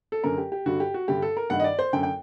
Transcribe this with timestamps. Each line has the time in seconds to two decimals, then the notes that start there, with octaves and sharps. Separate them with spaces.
0.12 A4
0.24 F#2 D3 A#4
0.38 G4
0.52 G4
0.66 G2 D3 F#4
0.80 G4
0.94 F#4
1.08 G2 D3 G4
1.22 A4
1.37 A#4
1.50 G2 D#3 F#5
1.60 D#5
1.64 D5
1.79 C5
1.93 F#2 D3 G5
2.03 G5